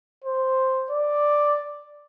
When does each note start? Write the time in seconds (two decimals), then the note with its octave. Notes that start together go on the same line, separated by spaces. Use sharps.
0.24 C5
0.91 D5